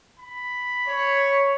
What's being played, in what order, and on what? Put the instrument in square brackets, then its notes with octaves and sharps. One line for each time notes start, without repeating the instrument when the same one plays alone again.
[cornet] B5
[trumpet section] C#5